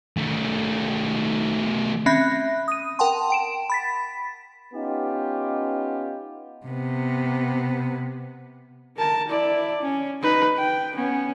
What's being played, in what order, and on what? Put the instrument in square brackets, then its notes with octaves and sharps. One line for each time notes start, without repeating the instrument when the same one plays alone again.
[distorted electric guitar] D#3 A3
[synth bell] C4 C#4 E5 B5 F#6 A#6
D#6 D#7
A#4 F#5 G5 A5 C6
G5 D7 E7
B5 A6 B6
[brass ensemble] B3 C#4 D#4 F4 G4
[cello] C3 B3
[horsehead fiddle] A#4 A5
E4 D5
C#4
D#4 B4
G5
B3 C#4